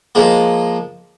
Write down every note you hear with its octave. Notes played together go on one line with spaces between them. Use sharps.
F3 G#3 A#3